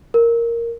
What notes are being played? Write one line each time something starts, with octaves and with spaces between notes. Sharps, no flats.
A#4